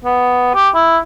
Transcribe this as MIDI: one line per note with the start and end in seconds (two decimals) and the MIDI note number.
0.05 0.52 59
0.54 0.69 67
0.75 0.98 64